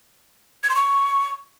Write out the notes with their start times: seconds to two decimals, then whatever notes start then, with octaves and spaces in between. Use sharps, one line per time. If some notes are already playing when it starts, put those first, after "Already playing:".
0.63 G#6
0.69 C6
0.76 C#6